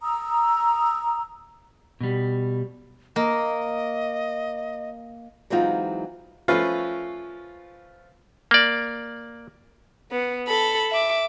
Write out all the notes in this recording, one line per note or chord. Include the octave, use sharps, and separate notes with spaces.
A#5 D#6 E6
B2 G3
A#3 D#5
E3 F#3 G#3 C4 D#4 F4
F3 A3 C#4 F4 B4 F5
A#3 D5
B3
A4 B5
E5 D6